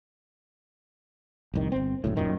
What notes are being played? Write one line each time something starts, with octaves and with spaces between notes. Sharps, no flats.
F1 C2 D#3
G1 C4
F#1 D2 A2
D#1 F#2 A#2 D#3